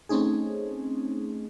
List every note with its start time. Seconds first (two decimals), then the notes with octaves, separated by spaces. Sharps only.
0.09 A3 C4 C#4 D#4 G#4